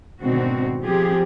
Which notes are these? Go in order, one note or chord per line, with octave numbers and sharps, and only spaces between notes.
G#2 B2 D3 D#3 C4 F#4
F3 C4 G4 G#4